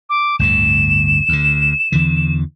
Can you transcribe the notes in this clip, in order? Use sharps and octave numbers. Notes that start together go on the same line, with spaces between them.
D6
G1 D2 A2 E7
D2 D3
E2 D3 E3